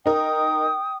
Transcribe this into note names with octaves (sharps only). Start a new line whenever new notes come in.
D#4 A#4 G5 D#6